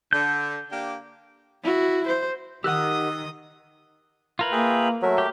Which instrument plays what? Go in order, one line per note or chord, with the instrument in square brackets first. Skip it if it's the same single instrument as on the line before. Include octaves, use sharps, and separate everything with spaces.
[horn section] D3 [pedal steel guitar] G6
[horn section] A#3 D4 G4
[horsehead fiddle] E4 F#4
C5
[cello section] D#3 [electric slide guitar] G4 A#4 F#5 [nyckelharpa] D#5 D#6 [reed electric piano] E6 F#6
[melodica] E4 [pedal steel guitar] F4 A#4 B4
[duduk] A#3 [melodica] G#4 E5 G5
[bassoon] F#3 [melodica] A3 A#4 E5
[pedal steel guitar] G4